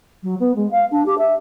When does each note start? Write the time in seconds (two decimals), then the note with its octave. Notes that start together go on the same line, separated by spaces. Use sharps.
0.23 F#3
0.39 B3
0.55 G#3
0.70 F5
0.91 D4
1.05 G4
1.17 E5